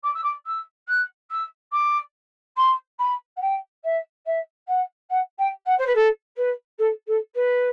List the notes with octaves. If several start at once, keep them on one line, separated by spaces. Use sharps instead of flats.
D6
E6
D6
E6
F#6
E6
D6
C6
B5
F#5
G5
E5
E5
F#5
F#5
G5
F#5
C5
B4
A4
B4
A4
A4
B4